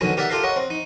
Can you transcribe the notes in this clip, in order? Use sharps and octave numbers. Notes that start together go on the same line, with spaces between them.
B2 D3 D#3 F#3 C#4
G4 A#4 D5 E5 F#5
F4 G4 A4 A#4 F5
A#4 C#5 D#5 F#5
C4
D#4